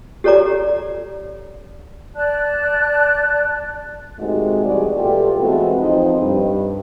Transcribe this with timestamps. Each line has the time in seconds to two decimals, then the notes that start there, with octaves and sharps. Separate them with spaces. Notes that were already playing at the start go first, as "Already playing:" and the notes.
0.24 G4 A4 C#5 D5 A#5 D6
2.15 D5 A5 F#6
4.18 G#2 C3 D#3 G#3 A3 F#4
4.64 E2 G3 F#4 G#4 D5
4.95 B2 A3 F4 G4 A4
5.39 E3 G#3 A3 B3 C4 F#4
5.79 F2 F3 C4 D#4 C5 D#5
6.20 G2